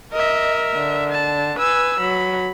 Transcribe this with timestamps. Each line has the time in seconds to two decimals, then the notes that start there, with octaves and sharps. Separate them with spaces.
0.13 A#4 D#5 E5
0.74 D3
1.11 A5
1.59 B4 G#5 E6
2.00 F#3 B5